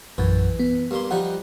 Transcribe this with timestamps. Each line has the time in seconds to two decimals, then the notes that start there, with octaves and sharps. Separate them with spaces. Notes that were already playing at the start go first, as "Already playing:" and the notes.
0.18 A#1 F#2 E3
0.59 B3
0.91 G2 A#3 C6
1.11 F3 G3 D#4 F#5